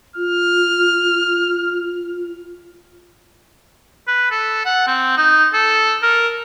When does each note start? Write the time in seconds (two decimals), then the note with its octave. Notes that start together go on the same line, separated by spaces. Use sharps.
0.16 F4 F6
4.08 B4
4.31 A4
4.65 F#5
4.87 C4
5.17 D#4
5.53 A4
6.03 A#4